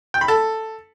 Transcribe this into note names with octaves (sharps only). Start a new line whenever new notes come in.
G5
B5
A4